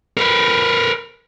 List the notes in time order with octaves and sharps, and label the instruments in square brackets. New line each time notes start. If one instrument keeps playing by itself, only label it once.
[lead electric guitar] A#4 B4